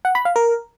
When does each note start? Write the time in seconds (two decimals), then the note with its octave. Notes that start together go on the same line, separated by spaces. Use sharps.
0.05 F#5
0.15 B5
0.25 F5
0.36 A#4